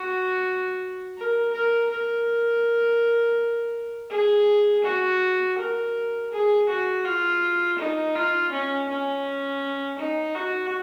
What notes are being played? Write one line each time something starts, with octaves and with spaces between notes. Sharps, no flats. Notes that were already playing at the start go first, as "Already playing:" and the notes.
Already playing: F#4
A#4
A#4
A#4
G#4
F#4
A#4
G#4
F#4
F4
D#4
F4
C#4
C#4
D#4
F#4